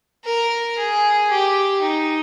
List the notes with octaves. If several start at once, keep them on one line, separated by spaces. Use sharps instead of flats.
A#4
G#4
G4
D#4